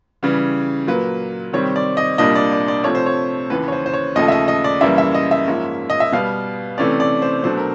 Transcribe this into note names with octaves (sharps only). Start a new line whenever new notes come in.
C#3 E3 G3
A#2 F#3 A#3 B4
C3 D#3 G3 C4 C#5
D5
D#5
C2 A#2 G3 A#3 D4 D#5
D5
D5
D5
C3 F3 A3 C#5
C5
C#5
D#2 C#3 E3 B4
C#5
C5
C5
C#5
D#2 C#3 F3 A3 D#5
E5
D#5
D#5
D5
F#2 C#3 E3 G3 A#3 E5
E5
D#5
E5
G#2 F3 A#3 C#4
D#5
E5
B2 G3 B3 F5
C3 E3 A3 C#4 D5
D5
C5
B2 F#3 A3 D4 C5
A#4